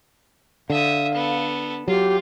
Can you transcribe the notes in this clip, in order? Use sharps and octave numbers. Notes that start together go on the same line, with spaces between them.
D3 E5 F5 D#6
B3 A4
F#3 F4 G4